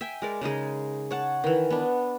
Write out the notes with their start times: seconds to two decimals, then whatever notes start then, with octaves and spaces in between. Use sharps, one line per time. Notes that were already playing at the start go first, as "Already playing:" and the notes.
0.01 E5 G5 G#5
0.22 G#3 A#4 D5
0.41 C#3 G#3 D#4 G#4
1.11 C#5 F#5 A5
1.44 D#3 E3
1.70 B3 D4